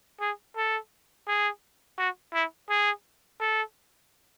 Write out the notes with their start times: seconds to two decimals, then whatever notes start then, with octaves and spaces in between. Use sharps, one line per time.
0.21 G#4
0.57 A4
1.28 G#4
1.98 F#4
2.34 E4
2.70 G#4
3.41 A4